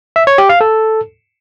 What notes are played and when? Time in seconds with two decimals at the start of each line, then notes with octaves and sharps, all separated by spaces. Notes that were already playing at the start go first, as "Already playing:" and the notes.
0.16 E5
0.27 C#5
0.38 G4
0.49 F5
0.61 A4